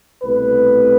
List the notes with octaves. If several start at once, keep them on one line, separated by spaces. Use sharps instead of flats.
C2 B2 A3 B4